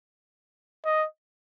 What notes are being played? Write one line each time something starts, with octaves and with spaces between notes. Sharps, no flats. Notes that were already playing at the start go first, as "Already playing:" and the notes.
D#5